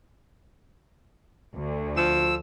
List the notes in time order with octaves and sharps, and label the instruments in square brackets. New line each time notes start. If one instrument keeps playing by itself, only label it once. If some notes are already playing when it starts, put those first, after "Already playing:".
[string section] D2
[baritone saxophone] F3 [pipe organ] E6